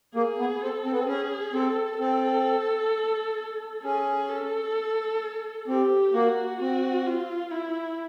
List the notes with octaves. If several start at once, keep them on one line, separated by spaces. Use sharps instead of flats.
A#3 G#4
B3
C4 A4
C4
B3
C4
C#4 G#4
C4 A4
C4 A4
C#4 G#4
A4
C4 G4
A#3 F#4
C4 F#4
F4
E4